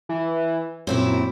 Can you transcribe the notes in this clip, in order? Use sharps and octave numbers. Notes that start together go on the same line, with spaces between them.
E3
F#2 A#2 C4 E4